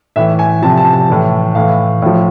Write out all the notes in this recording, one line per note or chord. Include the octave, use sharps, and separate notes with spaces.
A2 E3 E5
G#5
C3 F3 A5
A5
A5
A2 E3
A2 E3 F5
A2 F3